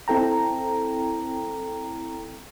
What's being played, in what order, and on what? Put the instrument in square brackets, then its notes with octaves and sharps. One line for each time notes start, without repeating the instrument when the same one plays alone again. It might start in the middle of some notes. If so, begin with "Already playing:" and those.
[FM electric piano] C4 E4 A4 G5 A#5